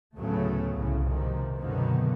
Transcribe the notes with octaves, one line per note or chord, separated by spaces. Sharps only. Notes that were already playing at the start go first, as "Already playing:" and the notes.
D2 A2 C#3 F#3 A3 B3
C2 A2 C#3
G#2 C3 D#3 F3
F#2 B2 D3 D#3 A#3 B3